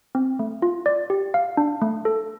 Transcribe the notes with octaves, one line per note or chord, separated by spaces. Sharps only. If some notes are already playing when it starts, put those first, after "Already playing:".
C4
A3
F4
D5
G4
F5
D4
A3
A4